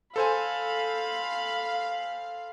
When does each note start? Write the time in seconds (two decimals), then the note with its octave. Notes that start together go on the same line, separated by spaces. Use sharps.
0.16 A4 C5 F5 G#5 B5